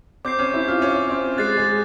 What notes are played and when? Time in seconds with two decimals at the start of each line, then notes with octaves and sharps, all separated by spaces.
0.25 C4 D6 G6 C7
0.39 C#4
0.54 E4
0.68 F4
0.82 C#4
1.09 C4
1.37 G#3 F#6 A6 C7
1.57 G#3